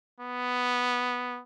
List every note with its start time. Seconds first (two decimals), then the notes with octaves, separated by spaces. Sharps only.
0.20 B3